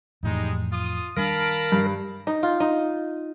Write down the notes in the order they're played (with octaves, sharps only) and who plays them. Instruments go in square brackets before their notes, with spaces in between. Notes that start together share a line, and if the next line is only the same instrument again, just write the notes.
[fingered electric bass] F2 A2 E3 [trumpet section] G3 G#3 D#4
[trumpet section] F4 D#6
[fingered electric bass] D#3 G3 D4 [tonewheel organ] A#4 [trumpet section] F5 A5 B5
[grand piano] G2
[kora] D#4
F4
D#4